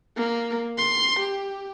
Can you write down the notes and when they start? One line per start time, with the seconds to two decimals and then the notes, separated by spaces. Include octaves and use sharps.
0.17 A#3
0.78 C6
1.19 G4